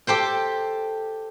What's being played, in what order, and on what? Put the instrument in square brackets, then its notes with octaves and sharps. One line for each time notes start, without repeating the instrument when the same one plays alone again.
[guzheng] G4 A4 C5 G5